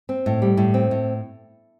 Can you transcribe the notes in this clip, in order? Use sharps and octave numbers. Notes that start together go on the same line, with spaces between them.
C4
A2
G3
A2
C4
A2